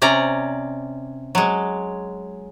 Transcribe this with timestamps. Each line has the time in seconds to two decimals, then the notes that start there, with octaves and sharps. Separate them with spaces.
0.02 C3 C#4 D5 A#5
1.35 F#3 G#3